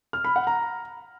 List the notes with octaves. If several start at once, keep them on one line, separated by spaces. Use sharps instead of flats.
F6
B5
F#5
A#5